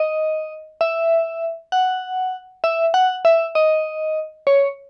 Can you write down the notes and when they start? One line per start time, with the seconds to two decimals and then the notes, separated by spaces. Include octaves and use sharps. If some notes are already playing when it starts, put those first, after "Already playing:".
Already playing: D#5
0.81 E5
1.72 F#5
2.64 E5
2.94 F#5
3.25 E5
3.55 D#5
4.47 C#5